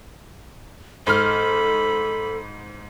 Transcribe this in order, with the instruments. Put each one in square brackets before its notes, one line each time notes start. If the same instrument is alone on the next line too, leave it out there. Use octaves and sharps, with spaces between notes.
[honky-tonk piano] G#2 F6 [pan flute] A4 [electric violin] B5